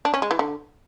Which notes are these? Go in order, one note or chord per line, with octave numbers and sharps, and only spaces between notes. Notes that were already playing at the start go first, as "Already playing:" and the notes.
D4
C#4
G#3
E3
D3